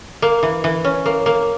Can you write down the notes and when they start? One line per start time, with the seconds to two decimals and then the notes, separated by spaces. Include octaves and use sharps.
0.22 A#3
0.43 E3
0.64 E3
0.84 C#4
1.06 A#3
1.26 A#3